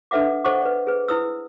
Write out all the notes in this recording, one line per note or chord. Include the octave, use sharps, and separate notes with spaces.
D4 A4 B4 E5 F#5 D6
A4 C5 D#5 F#5 C#6 D6
B4 D5
G#4 B4
E4 B4 D#6 E6